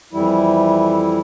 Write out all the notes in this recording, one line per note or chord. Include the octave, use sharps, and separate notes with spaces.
F2 E3 G3 E4